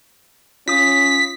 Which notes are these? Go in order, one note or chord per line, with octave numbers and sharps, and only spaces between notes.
C#4 F4 D#6 B6